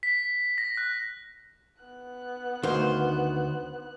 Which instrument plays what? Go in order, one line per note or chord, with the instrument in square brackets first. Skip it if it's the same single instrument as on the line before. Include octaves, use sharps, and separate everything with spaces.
[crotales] B6
A#6
F#6
[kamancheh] B3 F#6
[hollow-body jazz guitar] D2 D#3 F5 [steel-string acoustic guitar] C5